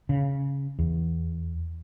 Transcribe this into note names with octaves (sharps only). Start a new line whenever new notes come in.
C#3
E2